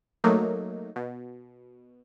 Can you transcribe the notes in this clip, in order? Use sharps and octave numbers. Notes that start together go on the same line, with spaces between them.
F#3 A3 A#3 D#4
B2